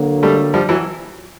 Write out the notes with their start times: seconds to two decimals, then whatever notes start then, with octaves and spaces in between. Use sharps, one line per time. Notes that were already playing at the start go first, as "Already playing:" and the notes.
Already playing: D3 F#3 A#3
0.23 G3 A3
0.54 F3 G3
0.69 E3 F#3